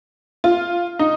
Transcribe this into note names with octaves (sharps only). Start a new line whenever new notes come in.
F4
D#4